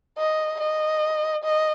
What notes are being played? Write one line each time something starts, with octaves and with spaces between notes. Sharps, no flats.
D#5
D#5
D#5